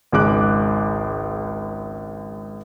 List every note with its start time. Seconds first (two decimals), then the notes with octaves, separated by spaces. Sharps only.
0.12 G#1 C#2 G#3 D6 F#6